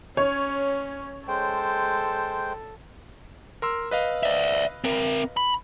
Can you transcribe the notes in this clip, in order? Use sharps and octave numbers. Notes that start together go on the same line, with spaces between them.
C#4 C#5
G#3 A4 C5 G5
A#4 C6 E6
B4 D#5 F5
D5 E5
C4 A#4
B5